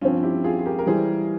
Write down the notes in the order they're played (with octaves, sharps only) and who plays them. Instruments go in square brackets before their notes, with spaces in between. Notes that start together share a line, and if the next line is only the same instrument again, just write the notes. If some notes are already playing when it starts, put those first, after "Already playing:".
[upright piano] G2 F3 C4 [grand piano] C#4 F4
[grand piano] E4 G4
F4 G#4
G#4
G4 A#4
A#4
[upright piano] E3 G3 [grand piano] G#4 C5